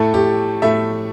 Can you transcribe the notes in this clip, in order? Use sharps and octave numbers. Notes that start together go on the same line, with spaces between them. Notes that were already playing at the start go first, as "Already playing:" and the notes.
Already playing: A2 A3 A4
G4
A2 A3 E5